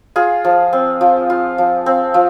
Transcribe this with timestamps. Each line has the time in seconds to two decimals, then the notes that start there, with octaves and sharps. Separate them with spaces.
0.16 F4 G#4
0.45 F3
0.73 C4
1.01 F3
1.30 F4
1.58 F3
1.86 C4
2.14 F3